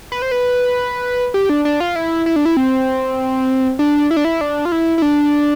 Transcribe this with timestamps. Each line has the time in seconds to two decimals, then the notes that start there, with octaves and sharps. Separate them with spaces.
0.12 B4
0.22 C5
0.31 B4
1.34 G4
1.49 D4
1.65 D4
1.80 F4
1.96 E4
2.26 E4
2.36 D4
2.45 E4
2.57 C4
3.79 D4
4.11 E4
4.17 D4
4.25 E4
4.41 D4
4.65 F4
4.72 E4
4.98 E4
5.02 D4